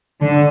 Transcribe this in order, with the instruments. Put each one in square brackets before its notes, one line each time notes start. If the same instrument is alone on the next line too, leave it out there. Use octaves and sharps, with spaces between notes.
[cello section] D3